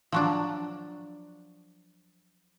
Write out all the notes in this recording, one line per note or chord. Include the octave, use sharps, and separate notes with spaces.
F3 F#3 D4